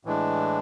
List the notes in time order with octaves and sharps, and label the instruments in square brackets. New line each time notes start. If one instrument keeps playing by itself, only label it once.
[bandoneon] A2 E3 G#3 D4